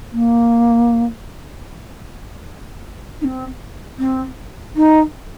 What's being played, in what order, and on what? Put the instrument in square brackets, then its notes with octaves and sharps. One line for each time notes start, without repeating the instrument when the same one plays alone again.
[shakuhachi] A#3
D#4
C4
C4
D#4